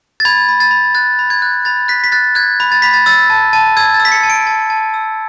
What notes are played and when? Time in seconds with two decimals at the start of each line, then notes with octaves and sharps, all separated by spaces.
0.20 A6
0.25 B5 G#6
0.49 B5
0.60 A6
0.71 B5
0.95 F#6 A6
1.19 B5
1.30 G#6
1.42 F#6
1.65 B5 A6
1.88 F#6 B6
2.04 B6
2.12 F#6 A6
2.35 F#6 G#6
2.60 B5
2.72 A6
2.82 B5 B6
2.94 A6
3.06 E6 A6
3.30 A5
3.53 A5
3.77 E6 G#6
3.94 A6
4.00 E6
4.05 B6
4.12 C#7
4.23 A5
4.30 D7
4.47 A5
4.70 A5
4.94 E6